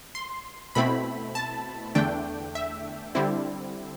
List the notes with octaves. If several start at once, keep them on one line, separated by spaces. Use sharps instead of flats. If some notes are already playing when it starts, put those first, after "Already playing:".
C6
B2 A3 C4 E4 B5
A5
E2 D3 A3 D4 G5
E5
D3 G3 C4 E4